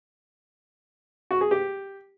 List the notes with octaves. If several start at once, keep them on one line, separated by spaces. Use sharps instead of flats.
F#4
G#4
G4